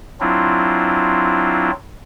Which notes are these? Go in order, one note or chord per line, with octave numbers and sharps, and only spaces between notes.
F#3 C4 D4 E4 F4